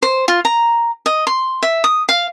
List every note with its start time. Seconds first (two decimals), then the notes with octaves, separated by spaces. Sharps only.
0.02 C5
0.28 F4
0.45 A#5
1.06 D#5
1.27 C6
1.63 E5
1.84 D#6
2.09 F5